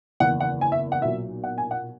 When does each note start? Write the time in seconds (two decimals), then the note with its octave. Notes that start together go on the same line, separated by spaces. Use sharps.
0.20 F#1 E2 D#3 F#5
0.40 F#5
0.61 G#5
0.72 E5
0.92 F#5
1.02 B1 A#2 F#3 E5
1.44 F#5
1.58 G#5
1.71 F#5